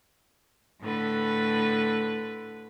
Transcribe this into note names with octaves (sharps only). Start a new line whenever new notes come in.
A2 D3 B4